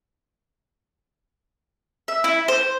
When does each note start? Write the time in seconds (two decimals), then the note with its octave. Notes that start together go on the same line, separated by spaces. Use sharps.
2.08 E5
2.24 E4
2.48 C5